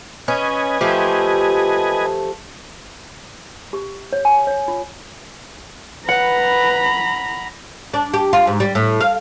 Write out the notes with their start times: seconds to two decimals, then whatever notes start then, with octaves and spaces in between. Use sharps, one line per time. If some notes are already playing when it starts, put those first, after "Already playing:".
0.28 C#4 B4 D#5 G#5
0.81 F3 A3 G4
3.73 G4
4.13 C#5
4.25 G#5
4.47 C#5
4.68 F4
6.09 B4 F#5 A#5 B5
7.94 D4
8.14 G4
8.33 F4
8.47 G#2
8.60 G3
8.75 A2
9.01 F5